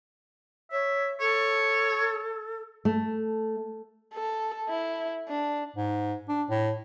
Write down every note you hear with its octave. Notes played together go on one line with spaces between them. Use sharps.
C#5 E5
A4 C#5
A3
A4
E4
D4
G#2
D4
A2